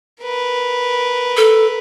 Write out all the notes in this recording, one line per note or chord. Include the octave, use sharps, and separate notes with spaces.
A#4 B4
A4